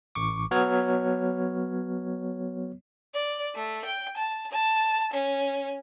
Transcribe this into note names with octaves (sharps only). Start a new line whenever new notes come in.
A1 C#6 D6
F#3 B3 C#5 F6 G#6
D5
A3
G5
A5
A5
C#4